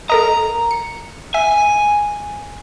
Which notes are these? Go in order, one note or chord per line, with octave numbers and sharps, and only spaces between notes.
A4 A#4 D#5 A#5
C#7
E5 G#5